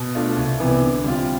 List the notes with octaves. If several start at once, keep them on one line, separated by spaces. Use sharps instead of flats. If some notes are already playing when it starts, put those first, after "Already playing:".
Already playing: B2
A3 D4 F4
C2
C3 E3 B3
D3
G3 C4 F4